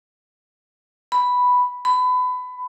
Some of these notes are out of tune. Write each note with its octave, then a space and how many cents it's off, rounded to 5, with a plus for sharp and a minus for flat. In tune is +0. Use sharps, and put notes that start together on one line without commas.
B5 +0
B5 +25